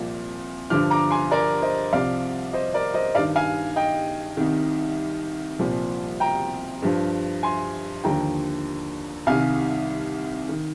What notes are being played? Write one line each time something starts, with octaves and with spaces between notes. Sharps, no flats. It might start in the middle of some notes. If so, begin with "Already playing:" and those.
Already playing: C2 A#2 F3
G2 D3 F3 D6 F6
A#5 D6
G#5 C6
A#4 D5
C5 D#5
C2 C3 F3 D5 F5
C5 D#5
A#4 D5
C5 D#5
G2 D#3 D5 F5
F5 G#5
D#5 G5
C2 C3 D#3
C2 A#2 F3
G5 A#5
G2 F3
G#5 C6
D#2 D3 F3 G5 A#5
C2 C3 D#3 F5 G#5
D#3